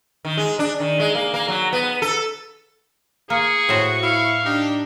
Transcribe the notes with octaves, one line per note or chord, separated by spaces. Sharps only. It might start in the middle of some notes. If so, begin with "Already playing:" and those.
D#3
G#3
D4
D#3
G#3
A#3
A#3
F#3
B3
A4
A#3 G#4 C#6
A2 F#4 C5
E4 F5
D4 D#4 G4